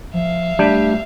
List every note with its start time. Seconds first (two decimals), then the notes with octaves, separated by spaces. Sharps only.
0.14 F3 E5 F5
0.59 G3 A3 D4 G4